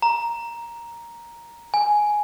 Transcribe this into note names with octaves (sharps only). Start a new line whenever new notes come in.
A#5
G#5